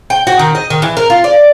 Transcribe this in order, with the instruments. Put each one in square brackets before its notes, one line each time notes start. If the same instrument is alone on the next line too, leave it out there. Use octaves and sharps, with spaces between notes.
[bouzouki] G5
F#4
D#3
D#5
D#3
E3
A#4
F4
D5